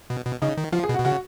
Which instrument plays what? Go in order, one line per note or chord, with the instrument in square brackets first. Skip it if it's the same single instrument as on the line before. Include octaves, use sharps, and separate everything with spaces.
[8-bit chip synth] B2
B2
[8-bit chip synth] C#3 [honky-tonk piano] D#4
[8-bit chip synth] D#3
[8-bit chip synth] F3 [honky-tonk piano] F4
[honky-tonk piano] G#4
[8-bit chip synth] B2
[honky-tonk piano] F#4
[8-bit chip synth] B2
[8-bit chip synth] C#3 [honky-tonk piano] F#4